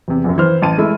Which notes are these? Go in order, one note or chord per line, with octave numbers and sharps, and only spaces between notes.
E2 C3
A#1 F#2
E3 C5 F6
A1 A5 D#7
G#3 A3 E4